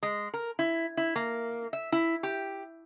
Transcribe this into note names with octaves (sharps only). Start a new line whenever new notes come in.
G#3
A#4
E4
E4
A#3
E5
E4
G4